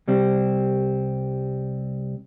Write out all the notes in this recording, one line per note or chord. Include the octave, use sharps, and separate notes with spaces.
C2 G3 C4